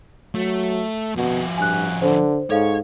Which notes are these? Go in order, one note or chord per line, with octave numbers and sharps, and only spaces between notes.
F#3 A3
F2 B2 F#4
G2 G#5 F#6
D3 C5
G#2 A4 C#5 F5